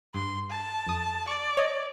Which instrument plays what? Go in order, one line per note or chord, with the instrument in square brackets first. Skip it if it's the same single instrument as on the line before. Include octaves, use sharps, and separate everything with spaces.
[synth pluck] G2 [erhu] C6
[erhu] A5
[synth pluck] F2 D#6
[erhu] D5 [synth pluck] C#6
[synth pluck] C#5 D#5